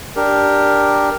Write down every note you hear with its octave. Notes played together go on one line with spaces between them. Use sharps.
D4 G4 A#4